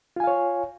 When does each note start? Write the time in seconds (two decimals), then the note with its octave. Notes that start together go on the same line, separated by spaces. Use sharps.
0.16 F4
0.20 G#5
0.24 F5
0.27 C#5